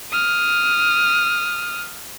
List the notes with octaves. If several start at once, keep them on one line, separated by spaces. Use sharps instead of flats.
D#6 F6